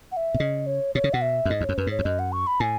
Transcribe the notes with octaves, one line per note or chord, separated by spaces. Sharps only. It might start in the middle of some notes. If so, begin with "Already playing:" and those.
F#5
E5
B2
C#3 D#5
C#5
B2 C#5
C#3
B2 F#5
E5
F#2
G#2 D#5
E2
F#2 C#5
F#2 B4
G#2 C#5
E2
F#2 D#5
F#5
C#6
B5
A2 G#5